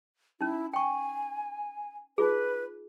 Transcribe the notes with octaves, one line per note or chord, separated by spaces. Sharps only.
C#4 D#4 E4
G5 G#5 C#6
D#4 F4 G#4 B4